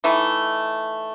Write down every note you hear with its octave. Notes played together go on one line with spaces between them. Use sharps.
E3 A3 D#4